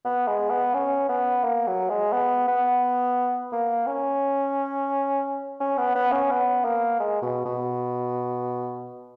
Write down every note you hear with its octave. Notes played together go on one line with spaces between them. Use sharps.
B3
G#3
B3
C#4
B3
A#3
F#3
G#3
B3
B3
A#3
C#4
C#4
B3
B3
C#4
B3
A#3
G#3
B2
B2